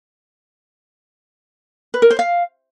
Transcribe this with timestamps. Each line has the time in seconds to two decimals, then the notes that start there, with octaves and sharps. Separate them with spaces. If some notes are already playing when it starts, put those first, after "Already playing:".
1.94 B4
2.02 A#4
2.10 C5
2.19 F5